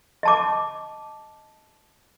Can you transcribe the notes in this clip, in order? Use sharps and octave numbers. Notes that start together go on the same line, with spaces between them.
D#5 A5 D6